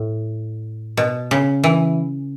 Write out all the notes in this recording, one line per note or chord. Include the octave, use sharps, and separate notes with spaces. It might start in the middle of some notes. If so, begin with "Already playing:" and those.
Already playing: A2
B2
C#3
E3